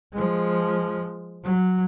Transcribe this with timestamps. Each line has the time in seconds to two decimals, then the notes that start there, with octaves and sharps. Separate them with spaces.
0.13 F3 G#3
1.44 F#3